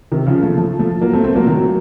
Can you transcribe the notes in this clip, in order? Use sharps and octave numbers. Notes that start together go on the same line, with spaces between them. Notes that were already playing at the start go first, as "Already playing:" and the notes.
C3 D#3
C#3 F3
F3 A3
F3 A3
F3 A3
F#3 A#3
A3 C4
A3 C4
F#3 A#3
D#3 F#3